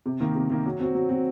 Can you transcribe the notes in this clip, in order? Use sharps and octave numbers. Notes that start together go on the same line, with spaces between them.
C3
D#3 A#3
C3
D#3 A#3
F#3
C4 F#4
F#3
C4 F#4